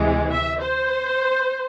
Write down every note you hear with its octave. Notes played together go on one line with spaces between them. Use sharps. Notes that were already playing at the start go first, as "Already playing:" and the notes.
Already playing: D2 C3 E3 G#3
E5
C5